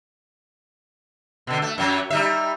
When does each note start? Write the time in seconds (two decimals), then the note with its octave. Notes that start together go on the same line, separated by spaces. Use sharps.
1.47 B2 D3
1.62 A3
1.78 F#2 F#3
2.10 G3 D#4 E5